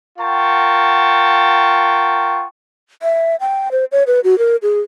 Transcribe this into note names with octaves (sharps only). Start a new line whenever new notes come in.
F4 A#4 F#5 G5 A5 C#6
E5
G5
C5
C#5
B4
F#4
A#4
G#4